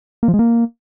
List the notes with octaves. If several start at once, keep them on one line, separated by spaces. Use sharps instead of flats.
A#3
F3
G#3
A#3